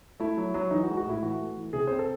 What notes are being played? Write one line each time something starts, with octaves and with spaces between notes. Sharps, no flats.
A3 E4
F#3
F#3
E3 D#4
F#4
G#3
F#4
A2 E4
E3 F#4
A3
E3
C3 G#4
C4 C5
A4